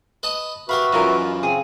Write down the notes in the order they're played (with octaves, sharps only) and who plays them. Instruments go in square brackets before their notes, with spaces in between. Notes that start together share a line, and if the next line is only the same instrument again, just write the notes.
[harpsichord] B4 D#5 A5
[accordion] F#4 B4 E5 [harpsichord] G4 A#4 F5 [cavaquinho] B5
[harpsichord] F#2 E3 F3 [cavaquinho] D#4 F4 A#4
[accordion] C#3 C4 [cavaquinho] G#4 G#5 D#6